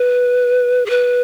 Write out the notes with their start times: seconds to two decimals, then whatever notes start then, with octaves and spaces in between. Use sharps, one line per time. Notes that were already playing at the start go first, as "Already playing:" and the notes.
Already playing: B4
0.86 G#4
0.90 B4